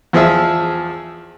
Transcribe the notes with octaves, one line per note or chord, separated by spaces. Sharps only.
E2 F3 G#4 E5